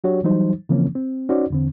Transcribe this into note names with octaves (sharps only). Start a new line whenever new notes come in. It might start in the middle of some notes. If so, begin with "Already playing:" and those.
F#3 D4 F#4 G4 C#5
E3 F#3 G3 D#4 C5
C#3 E3 F3 A#3 C4 C#4
C4
C#4 D#4 F#4 C5 D5
E2 D3 C4